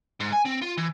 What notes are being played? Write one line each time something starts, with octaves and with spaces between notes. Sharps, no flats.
G#2
G#5
C4
F4
E3